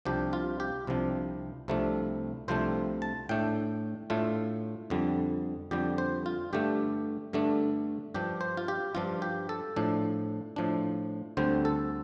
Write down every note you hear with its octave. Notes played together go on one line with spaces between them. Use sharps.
C2 C3 F3 D4 G4
F4
G4
C2 C3 F3 D4
C2 C3 F3 A3 D4
C2 C3 F3 A3 D4 C5
A5
A2 A3 D4 G5
A2 A3 D4 F4
F2 D3 G3
F2 D3 G3 G4
C5
F4
G2 D3 A3 D4 G4
G2 D3 A3 D4
G2 F3 D4 G4
C5
F4
G4
G2 F3 D4 F4
G4
A4
A2 F3 D4
A2 F3 D4
D2 D3 G3 C4 C5
A4